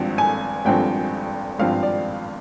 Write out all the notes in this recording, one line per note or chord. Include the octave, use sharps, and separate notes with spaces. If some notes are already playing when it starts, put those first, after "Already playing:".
Already playing: G#1 G2 F3 C4
G#5
G#1 G2 F3 C4 G5
G#1 G2 F3 C4 F5
D5